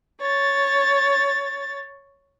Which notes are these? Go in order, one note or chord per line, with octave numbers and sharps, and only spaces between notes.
C#5 A6